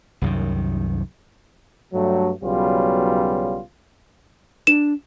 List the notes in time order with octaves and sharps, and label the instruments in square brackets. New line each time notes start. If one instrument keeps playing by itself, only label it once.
[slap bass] C2 F#2 D#3
[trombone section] G2 F#3 A3
B1 C#3 F#3 G3 B3 F4
[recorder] D4 [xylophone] E7